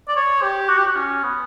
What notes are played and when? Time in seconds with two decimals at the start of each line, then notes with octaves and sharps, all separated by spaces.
0.08 D5
0.16 C#5
0.43 G4
0.69 F#4
0.78 G4
0.87 F#4
0.96 C#4
1.23 B3